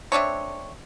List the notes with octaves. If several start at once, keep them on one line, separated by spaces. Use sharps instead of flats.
A3 C4 D4 C#5